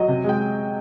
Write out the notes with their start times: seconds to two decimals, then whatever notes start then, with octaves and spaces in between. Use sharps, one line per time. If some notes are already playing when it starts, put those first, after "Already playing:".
Already playing: F#3 D#5
0.08 C3
0.24 G#3 G5